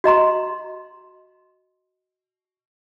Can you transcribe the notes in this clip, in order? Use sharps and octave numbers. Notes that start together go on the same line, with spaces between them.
F#4 D#5 A#5 C6